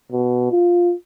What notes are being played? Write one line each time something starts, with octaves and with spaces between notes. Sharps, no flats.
B2
F4